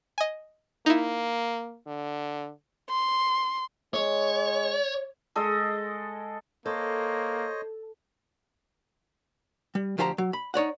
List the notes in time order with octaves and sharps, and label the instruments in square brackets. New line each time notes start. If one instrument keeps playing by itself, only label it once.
[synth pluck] D#5 G#5
[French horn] A#3 [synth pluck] D#4 E4
[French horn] D3
[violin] C6
[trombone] G#3 [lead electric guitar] C#5
[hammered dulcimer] G#3 A4 D#5
[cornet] A#3 [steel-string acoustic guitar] A4 [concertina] C5 C#5 D#5
[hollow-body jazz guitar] G3
D2 F3 G4 C5 A5 A#5
F#3
B5
D#4 C#5 D5 F#5